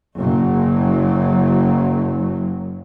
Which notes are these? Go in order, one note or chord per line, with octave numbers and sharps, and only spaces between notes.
F#1 F#3